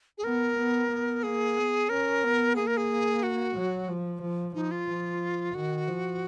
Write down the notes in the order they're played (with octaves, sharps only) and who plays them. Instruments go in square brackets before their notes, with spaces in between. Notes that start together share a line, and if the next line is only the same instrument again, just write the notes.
[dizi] G#4
[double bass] B3 [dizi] A#4
[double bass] B3
B3
[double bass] A#3 [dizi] G#4
[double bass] B3
[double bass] C#4 [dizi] A#4
[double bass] B3
[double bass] A#3 [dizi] G#4
[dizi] A#4
G#4
F#4
[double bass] F#3
F3
F3
[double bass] F3 [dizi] D#4
[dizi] F4
[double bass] F3
[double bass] D#3 [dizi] F#4
[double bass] F3